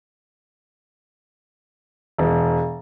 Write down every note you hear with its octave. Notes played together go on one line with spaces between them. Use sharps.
E1